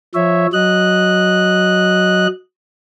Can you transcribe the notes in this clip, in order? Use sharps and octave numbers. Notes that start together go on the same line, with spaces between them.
F3 C#5 E5
F#3 D#5 F#6